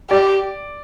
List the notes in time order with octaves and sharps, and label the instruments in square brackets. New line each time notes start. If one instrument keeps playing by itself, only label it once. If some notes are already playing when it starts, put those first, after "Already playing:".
[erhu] G4 [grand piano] D5